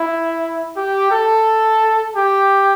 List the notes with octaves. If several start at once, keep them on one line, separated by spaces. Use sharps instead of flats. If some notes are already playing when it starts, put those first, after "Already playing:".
Already playing: E4
G4
A4
G4